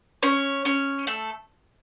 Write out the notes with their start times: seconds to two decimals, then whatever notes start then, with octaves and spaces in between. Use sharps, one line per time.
0.23 C#4 C#5
0.65 C#4 C#5
1.07 A3 A4